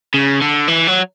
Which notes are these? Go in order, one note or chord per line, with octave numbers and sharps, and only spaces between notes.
C#3
D3
E3
F#3